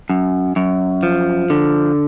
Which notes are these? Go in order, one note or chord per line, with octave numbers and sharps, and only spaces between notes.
F#2
F#2
F3
D3